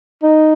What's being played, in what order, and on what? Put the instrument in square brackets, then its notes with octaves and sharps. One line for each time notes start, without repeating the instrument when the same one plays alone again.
[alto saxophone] D#4